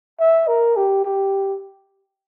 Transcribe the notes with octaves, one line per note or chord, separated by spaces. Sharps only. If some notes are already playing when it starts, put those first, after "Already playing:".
E5
A#4
G4
G4